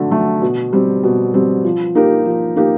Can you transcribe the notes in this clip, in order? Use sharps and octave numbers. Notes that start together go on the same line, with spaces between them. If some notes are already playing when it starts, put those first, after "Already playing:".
Already playing: D3 F#3 A3
F#3 A3
B2
G3 C4
B2
G3 C4
F3
A#3 D#4 G4 A#4
F3
A#3 D#4 G4 A#4